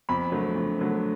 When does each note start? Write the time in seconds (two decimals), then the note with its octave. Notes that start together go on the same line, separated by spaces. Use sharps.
0.09 F2 B5
0.32 D3 F#3 A3
0.56 F2
0.79 D3 F#3 A3